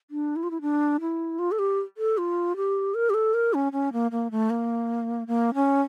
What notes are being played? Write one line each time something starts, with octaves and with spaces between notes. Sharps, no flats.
D4
E4
F4
E4
D4
E4
F4
A4
G4
A4
F4
G4
A#4
G4
A4
A#4
C#4
C#4
A#3
A#3
A3
A#3
A#3
C#4